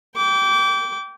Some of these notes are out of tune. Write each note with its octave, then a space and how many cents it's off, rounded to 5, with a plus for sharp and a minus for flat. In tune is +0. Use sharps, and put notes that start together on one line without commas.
G5 -5 D6 -25